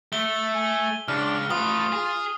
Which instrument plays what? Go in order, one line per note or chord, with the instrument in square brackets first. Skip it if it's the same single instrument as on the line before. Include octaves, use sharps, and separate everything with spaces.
[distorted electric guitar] A3 [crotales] G7
[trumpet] G#5
[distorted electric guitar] C#2 [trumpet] D4 [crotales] F6
[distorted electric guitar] A3 B4 [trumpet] F4 [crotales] D#6
[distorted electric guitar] G#4